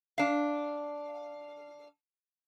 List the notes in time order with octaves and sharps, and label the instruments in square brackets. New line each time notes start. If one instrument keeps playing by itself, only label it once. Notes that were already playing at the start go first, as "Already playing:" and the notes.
[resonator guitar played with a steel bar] D4 F5